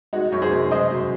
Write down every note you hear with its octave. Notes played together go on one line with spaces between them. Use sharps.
G#3 D#4 F#4
F#2 C#5
G#4 C5
F#2
G#3 C5 D#5
F#2